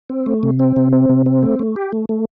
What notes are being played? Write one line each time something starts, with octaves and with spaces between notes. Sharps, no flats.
C4
A3
C3
C4
C3
C4
C3
C4
A3
A3
G4
A3
A3